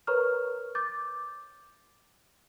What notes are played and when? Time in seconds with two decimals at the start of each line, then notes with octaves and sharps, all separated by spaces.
0.07 A#4 B4 C#5 A#5 C#6 F6
0.75 D6 G6 A6